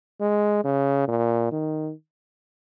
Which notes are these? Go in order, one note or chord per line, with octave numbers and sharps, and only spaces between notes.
G#3
C#3
A#2
D#3